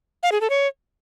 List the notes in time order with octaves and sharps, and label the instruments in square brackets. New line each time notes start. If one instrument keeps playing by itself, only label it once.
[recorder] F5
G#4
A4
C#5